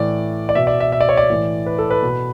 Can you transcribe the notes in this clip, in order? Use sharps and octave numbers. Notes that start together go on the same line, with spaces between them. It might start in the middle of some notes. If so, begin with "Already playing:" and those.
Already playing: A2 E3 D5
D5
B2 E5
D5
E5
E5
D5
C#5
D5
A2 E3
B4
A4
B4
B2